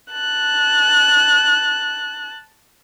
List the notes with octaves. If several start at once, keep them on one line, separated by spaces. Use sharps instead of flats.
A5 F#6